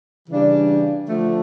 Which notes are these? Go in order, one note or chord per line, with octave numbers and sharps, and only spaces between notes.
C#3 E3 G3 D4
D3 F3 A3